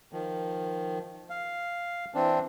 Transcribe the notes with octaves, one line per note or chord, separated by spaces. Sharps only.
D#3 F3
F5
E3 C4 D4